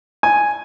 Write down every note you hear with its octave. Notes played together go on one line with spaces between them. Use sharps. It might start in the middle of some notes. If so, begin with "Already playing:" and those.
G#5